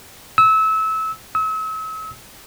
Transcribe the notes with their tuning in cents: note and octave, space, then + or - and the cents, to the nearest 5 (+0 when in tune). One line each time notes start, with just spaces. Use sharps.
E6 -25
E6 -40